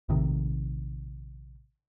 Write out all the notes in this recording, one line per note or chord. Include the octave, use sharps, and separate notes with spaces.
A#1 A2 C3 D#3